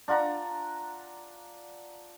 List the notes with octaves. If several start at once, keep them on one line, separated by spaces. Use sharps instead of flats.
D4 F4 F#5 A#5